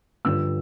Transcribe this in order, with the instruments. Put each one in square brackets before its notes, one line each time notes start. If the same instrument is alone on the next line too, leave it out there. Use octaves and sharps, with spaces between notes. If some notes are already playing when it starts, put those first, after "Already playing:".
[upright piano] G2 D3 F3 E6